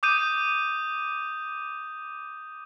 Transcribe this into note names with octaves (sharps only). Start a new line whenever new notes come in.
D6 D#6 G6 D#7